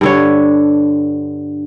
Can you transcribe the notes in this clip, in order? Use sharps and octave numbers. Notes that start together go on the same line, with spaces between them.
G2 D3 C#5